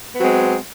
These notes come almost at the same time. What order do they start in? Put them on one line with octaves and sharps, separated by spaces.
B3 F#3 C4 G#3